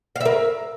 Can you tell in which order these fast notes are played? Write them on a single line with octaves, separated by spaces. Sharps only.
F5 E5 A#4